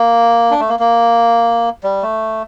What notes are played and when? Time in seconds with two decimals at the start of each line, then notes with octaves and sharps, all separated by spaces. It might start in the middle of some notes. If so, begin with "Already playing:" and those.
Already playing: A#3
0.51 D4
0.60 A3
0.69 A#3
0.79 A#3
1.84 G3
2.03 A3